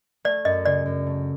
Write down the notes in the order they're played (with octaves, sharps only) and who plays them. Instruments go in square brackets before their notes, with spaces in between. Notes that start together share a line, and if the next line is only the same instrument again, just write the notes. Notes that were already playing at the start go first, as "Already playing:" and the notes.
[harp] A3 [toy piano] D5
[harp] F#2 [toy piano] D#5
[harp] C#3 [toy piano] D5
[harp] F#2
A3